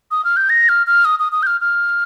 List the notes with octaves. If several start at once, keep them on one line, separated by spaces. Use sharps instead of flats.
D#6
F6
G6
A#6
F6
F6
D#6
D#6
D#6
G6
F6
F6